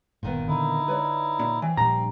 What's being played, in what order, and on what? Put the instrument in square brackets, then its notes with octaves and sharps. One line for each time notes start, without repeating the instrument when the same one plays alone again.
[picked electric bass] G1 [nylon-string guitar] A#2 D#3 B3
[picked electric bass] D3 [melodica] D#4 E4
[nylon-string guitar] B4 C#5 D5
[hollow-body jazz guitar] A#2
[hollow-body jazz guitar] E3 [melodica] C4
[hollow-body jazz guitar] G2 A#5 [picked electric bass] A#2 F3